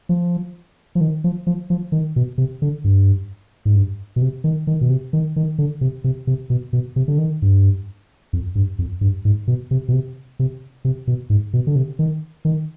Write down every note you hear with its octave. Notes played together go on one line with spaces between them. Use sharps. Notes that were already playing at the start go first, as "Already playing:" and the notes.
F3
F3
D#3
F3
F3
F3
D#3
B2
C3
D3
G2
G#2
G2
B2
C3
D#3
D#3
B2
C3
D#3
D#3
D3
C3
C3
C3
B2
B2
C3
D3
D#3
G2
F2
G2
F2
G2
G#2
B2
C3
B2
C3
C3
C3
B2
G#2
B2
D3
C3
D#3
D#3